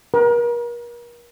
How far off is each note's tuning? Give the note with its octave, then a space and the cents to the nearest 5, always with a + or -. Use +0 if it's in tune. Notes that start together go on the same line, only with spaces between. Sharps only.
A#4 +40